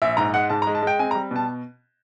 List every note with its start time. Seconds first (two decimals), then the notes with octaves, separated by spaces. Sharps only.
0.02 A#1 E5
0.17 G#2 A#5
0.33 G#3 F#5
0.50 G#2 A5
0.62 A#5
0.67 G#3
0.75 A5
0.82 G#3 G5
0.99 C4 G#5
1.11 A#5
1.15 G3
1.31 B2 A5